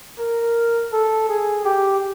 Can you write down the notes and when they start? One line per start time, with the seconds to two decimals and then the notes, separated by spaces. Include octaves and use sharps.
0.19 A#4
0.93 A4
1.29 G#4
1.65 G4